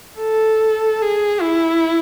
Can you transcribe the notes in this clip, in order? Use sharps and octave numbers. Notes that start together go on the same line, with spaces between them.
A4
G#4
E4